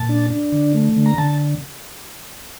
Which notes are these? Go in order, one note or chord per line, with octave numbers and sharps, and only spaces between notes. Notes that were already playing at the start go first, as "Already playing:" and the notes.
Already playing: A#2 A5
D4
D4
D3
A3
D3
A#5
D3 A5